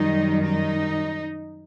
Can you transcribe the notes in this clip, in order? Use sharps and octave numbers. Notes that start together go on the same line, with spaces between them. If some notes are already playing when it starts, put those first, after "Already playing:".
Already playing: F#2 D#3 G3 D#4
D#4